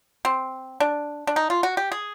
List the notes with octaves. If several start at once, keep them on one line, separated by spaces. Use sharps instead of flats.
C4
D4
D4
D#4
F4
F#4
G4
G#4